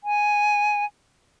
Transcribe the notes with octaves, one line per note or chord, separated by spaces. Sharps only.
G#5